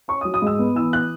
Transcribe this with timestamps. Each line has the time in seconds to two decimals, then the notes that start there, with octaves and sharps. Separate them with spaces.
0.08 C#4 C#6
0.21 D#6
0.25 F#3
0.34 D#6
0.42 G#2 E6
0.59 B3
0.75 E3 E6
0.93 F#6